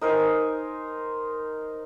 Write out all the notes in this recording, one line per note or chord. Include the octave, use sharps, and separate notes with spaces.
D#4 A#4 C5 G#5